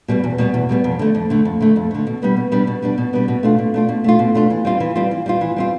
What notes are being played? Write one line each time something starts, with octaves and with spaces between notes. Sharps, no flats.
B2 G3 B3
E2
B2 G3 B3
E2
B2 G3 B3
F2
D3 A3
F2
D3 A3
F2
D3 A3
F2
D3 A3
B2
G3 B3 D4
B2
G3 B3 D4
B2
G3 B3 D4
B2
G3 B3 D4
B2
A3 D4 F4
B2
A3 D4 F4
B2
A3 D4 F4
B2
A3 D4 F4
E3
G3 C4 F4
E3
G3 C4 F4
E3
G3 C4 F4
E3
G3 C4 F4